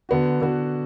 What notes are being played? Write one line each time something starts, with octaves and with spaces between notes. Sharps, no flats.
D3 B3 F#4
D3 B3 F#4